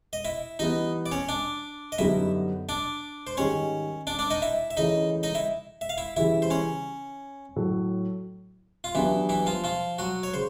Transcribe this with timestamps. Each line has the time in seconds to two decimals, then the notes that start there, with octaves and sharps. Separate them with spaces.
0.13 D#5
0.25 E4 E5
0.59 E3 G3 B3 D#4 D#5
1.06 D5
1.12 C#4 C#5
1.29 D4 D5
1.92 D#5
1.98 F#2 D3 G3 B3 D#4 E4 E5
2.69 D4 D5
3.27 C5
3.37 G#2 D#3 G3 C#4 C#5
4.07 D4 D5
4.19 D4 D5
4.30 D#4 D#5
4.42 E4 E5
4.71 E5
4.77 C#3 E3 A3 C#4 D#4 D#5
5.23 D#4 D#5
5.35 E4 E5
5.81 E5
5.89 F5
5.98 E4 E5
6.16 C#3 E3 G3 E4 E5
6.42 C5
6.50 C#4 C#5
7.56 A2 F#3 A3
8.84 F4
8.94 E3 F#3 B3 D4 E4 G4
9.29 E3 E4
9.46 F3 F4
9.64 F3 F4
9.98 F#3 F#4
10.23 C#5
10.34 C#3 C5